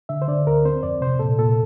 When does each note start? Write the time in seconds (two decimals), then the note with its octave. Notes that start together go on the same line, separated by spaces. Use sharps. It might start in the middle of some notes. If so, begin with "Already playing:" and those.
0.09 D3 E5
0.22 C5
0.28 D3 D5
0.47 D2 A#4
0.65 C4 C5
0.83 F2 D5
1.01 C3 C5
1.19 A#2 A4
1.39 A#2 A4